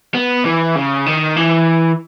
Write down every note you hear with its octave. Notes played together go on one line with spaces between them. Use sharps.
B3
E3
C#3
D#3
E3